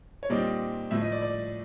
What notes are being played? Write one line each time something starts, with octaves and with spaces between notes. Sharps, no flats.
C#5
A#2 G3 C4 D#4 D5
A2 F3 A3 E5
D#5
D5
D5